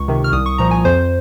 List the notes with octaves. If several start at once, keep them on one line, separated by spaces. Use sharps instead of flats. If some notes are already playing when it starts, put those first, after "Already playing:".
Already playing: C#2 C#6
C3 D#3
F6
C2 D#6
C#6
A#2 F3 A#5
G#5
F2 C5